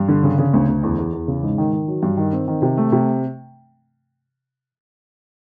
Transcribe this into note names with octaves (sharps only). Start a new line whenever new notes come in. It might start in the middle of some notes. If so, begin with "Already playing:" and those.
Already playing: G2
D3
C#3
C#3
D2
D2
E2
E2
E2
C#3
G#2
D#3
D#3
F#3
G2
D#3
C4
D#3
C3
A3
C3